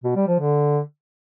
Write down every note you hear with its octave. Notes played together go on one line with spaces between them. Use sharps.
B2
G3
F3
D3